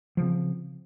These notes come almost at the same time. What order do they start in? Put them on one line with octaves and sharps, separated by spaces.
F3 C#3 C4